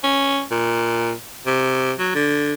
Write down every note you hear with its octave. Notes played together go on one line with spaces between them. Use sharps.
C#4
A#2
C3
F#3
D3